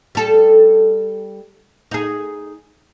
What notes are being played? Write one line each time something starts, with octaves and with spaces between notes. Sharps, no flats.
G3 A4
D#4 G#4